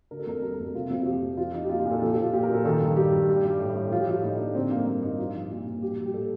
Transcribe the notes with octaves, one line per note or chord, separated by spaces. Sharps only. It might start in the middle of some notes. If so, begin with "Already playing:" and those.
D3 A#4
A4
F2 A#4
G3 A4
A#4
F2 A4
C3 F4
F2 F4
F4
F3 G4
F2
F3 F4
F3 D#4
G4
A#2 F4
F4
A#2
A4
F3 A4
G4
F3 F4
A#2 G4
A#4
A#2
A4
D#3 A4
G2
G3 G4
G2
G3
G3
A2
A2
F3 F4
G4
F3 F4
A2 D#4
A2 D4
D3 C4
G2 A#3
G3 A#3
G2 D#4
F3 F4
F3
A#2
A#2
G3 G4
G3
G4
A2 A4